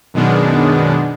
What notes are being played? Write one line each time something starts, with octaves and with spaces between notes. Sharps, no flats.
F#2 B2 D#3 G#3 B3 D4